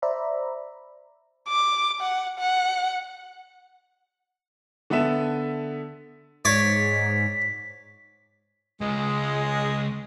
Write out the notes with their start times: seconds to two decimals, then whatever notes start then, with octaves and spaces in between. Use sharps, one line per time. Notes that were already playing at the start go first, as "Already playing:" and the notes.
0.02 C5 D5 E5 A#5 B5
1.49 D6
2.01 F#5
2.39 F#5
4.90 D3 B3 A4 E5 E7
6.45 G#2 C#5 D5 B6
8.81 C#2 G#3